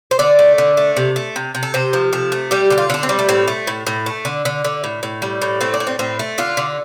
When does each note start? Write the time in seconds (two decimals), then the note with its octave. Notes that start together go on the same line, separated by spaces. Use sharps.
0.11 C5
0.19 D3 D5
0.39 A3
0.58 D3
0.77 A3
0.96 C3
1.16 A3
1.36 C3
1.55 C3
1.63 A4
1.74 C3 C5
1.93 F3
2.13 C3 A4
2.32 A3
2.51 G3 G4
2.70 D3 G4
2.78 F4
2.90 D3 D4
3.03 C4
3.09 G3
3.19 A3
3.29 A2 C4
3.48 A3
3.67 A2
3.87 A2
4.06 A3
4.25 D3
4.45 D3
4.64 D3
4.84 A2
5.03 A2
5.22 G3
5.42 A2
5.61 A3 C4
5.74 D4
5.80 A2
5.87 C4
5.99 A2 C4
6.19 A3
6.38 D3 F4
6.57 D3